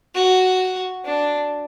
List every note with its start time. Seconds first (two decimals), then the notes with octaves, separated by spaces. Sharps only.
0.15 F#4
1.05 D4